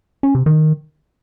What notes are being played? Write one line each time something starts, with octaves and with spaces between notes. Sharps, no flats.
C#4
C3
D#3